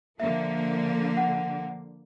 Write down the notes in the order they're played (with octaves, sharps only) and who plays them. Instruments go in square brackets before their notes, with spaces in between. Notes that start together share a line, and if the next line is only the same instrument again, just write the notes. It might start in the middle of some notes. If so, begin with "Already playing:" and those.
[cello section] D3 F3 A#3 [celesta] E5
[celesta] F#5